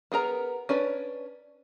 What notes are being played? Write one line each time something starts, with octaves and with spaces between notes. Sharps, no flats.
B3 G#4 A#4 A#5
C#4 D4 B4